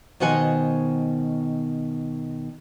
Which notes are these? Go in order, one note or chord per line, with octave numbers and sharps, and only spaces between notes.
B2 D#3 C5 F#5 G#5